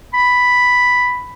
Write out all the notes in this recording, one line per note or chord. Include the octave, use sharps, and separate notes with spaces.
B5